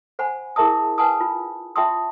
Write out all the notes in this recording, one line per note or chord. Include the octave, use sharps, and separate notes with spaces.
C5 F#5 G#5 B5
E4 G#4 A#4 E5 A5 D#6
B4 F#5 G#5 A5 D#6
F4
F4 E5 G5 A5 C6 D#6